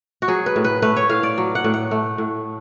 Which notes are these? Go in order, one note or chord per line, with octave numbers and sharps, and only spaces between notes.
F#4
F#3 G#4
B4
A2
B4
A3 B4
C#5
A2 F5
D5
F#3
F#5
A2
F#5
A3
A2